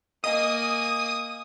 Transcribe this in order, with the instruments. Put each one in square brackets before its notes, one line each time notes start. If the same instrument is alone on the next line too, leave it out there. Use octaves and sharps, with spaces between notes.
[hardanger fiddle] A#3 G#5 [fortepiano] D#5 [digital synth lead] D#6